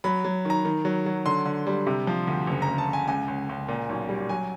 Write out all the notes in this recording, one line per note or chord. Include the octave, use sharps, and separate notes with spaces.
F#3 B5
F#3
D#3 A#5
D#3
F#3
F#3
D3 C6
D3
G3
C3
F3
D2
F#1
A#5
F#1
A5
F#1
G#5
C#2 G#5
C#2
C#2
A#2
B1
G3
F#3 G#5